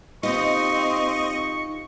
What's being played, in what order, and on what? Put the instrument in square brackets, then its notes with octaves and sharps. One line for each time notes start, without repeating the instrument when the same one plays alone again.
[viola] C4 [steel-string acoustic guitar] D#4 F4 G4 [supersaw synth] D#5 [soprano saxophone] C#6